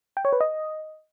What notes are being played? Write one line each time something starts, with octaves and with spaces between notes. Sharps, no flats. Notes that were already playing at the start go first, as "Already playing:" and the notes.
G5
C#5
B4
D#5